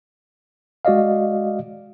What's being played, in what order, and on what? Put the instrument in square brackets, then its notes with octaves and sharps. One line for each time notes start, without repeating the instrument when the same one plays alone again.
[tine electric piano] G#3 F#4 D5 D#5 F5